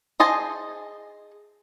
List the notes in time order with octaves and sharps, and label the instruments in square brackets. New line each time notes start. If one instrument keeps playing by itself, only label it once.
[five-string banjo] G#4 C5 D#5 G#5 A5